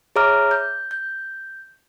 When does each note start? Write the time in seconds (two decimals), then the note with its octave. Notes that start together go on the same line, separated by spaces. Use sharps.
0.16 G#4 C#5 E5 A#5 D6 F6
0.51 G6
0.91 G6